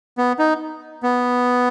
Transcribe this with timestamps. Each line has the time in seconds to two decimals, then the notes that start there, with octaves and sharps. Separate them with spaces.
0.18 B3
0.39 D#4
1.03 B3